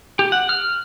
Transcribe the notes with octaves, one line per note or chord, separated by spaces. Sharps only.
G4
F#5
F6